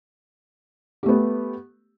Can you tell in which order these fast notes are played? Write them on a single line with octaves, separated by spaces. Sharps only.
G4 A3 B3